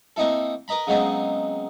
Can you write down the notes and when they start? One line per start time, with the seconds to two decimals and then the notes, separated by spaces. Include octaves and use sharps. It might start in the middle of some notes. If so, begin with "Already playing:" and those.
0.16 A#3 C4 D#4 E4 A4
0.68 A#4 B4 D#5 A#5 B5
0.87 C#3 F#3 G#3 B3 C4 D#4